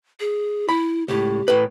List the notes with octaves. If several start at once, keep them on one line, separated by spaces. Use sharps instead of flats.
G#4
E4 B5
C#2 A2 G4
A2 B4